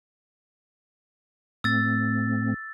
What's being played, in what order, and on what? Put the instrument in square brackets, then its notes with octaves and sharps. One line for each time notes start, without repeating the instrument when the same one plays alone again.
[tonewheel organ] A2 A3 C4 [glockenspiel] E6 A6